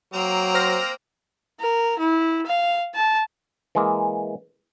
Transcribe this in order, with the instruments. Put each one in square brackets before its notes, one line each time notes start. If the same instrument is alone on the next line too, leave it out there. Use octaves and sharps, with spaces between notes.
[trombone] F#3 [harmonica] A#3 C4 A#5
[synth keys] C5 F6 A#6
[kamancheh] A#4
E4
F5
A5
[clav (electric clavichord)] E3 G#3 A#3